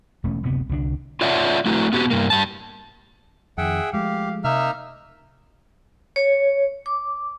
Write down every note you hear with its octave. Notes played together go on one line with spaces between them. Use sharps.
E1 A3 C#4
F#1 D2 C3 B3
C2 D3 F3 D4
F4 C#5 D5 E5 F#5 A5
A3 E4 F#4
B3 F#4 G4
G2 A#3
G2 A5
F2 D#3 G#4 E5 F#5 G5
F3 G#3 A3 G4 F5
C3 A#3 D#4 E5 F6
C#5
D6